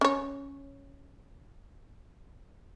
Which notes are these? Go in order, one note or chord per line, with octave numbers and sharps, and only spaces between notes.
C#4 C#5